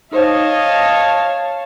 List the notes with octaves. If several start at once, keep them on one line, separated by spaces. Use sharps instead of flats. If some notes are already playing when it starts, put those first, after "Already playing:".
D#4 C5 C#5 D#5 F5 A5